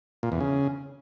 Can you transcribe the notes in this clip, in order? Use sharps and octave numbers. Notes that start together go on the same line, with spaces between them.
A#2
E2
C#3